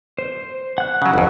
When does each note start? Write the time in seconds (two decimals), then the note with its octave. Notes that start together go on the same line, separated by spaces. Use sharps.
0.19 C5
0.78 F#5 F#6
1.02 C#3 F#3
1.14 G1 F2